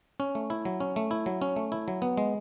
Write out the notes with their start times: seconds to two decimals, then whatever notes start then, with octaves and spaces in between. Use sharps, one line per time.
0.20 C#4
0.35 A3
0.50 E4
0.65 F#3
0.80 C#4
0.96 A3
1.11 E4
1.26 F#3
1.42 C#4
1.56 A3
1.72 E4
1.88 F#3
2.02 B3
2.17 G#3